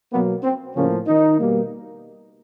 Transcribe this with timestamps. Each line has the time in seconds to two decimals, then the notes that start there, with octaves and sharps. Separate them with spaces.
0.12 B2 F#3 A#3 B3
0.44 C4
0.75 A2 C#3 F3 A#3 C#4
1.07 D#3 D#4
1.39 B2 G3 A#3